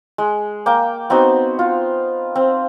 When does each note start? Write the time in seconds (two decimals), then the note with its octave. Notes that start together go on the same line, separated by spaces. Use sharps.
0.18 G#3
0.66 A#3 G5 D6
1.10 B3 C4 D#4 F#4
1.59 F4
2.36 C4